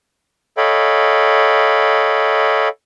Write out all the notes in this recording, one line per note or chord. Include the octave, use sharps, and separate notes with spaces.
A4 C#5 D#5 F5 G5 B5